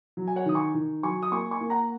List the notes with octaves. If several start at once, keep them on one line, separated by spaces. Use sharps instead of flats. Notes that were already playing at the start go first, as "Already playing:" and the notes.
F#3
G#5
C#5 F#5
D#3 D#6
G#5 C#6
D#3
F#3 G#5 C#6
D#6
A#3 G#5 C#6
G#5 C#6
A#3
F#5 A#5